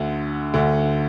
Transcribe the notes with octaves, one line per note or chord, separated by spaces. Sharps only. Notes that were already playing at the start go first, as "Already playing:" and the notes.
Already playing: D2 D3
D2 D3